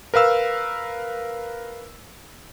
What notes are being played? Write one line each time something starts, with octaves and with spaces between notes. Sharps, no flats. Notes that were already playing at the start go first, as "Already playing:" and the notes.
A#4 B4 F5 E6